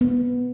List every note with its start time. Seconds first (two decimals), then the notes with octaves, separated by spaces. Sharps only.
0.01 B3